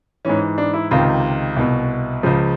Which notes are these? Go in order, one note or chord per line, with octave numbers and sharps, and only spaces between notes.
G#2 E3 C#4
D4
E4
C#2 C3 D#3 F4
C2 B2
C#2 C#3 F3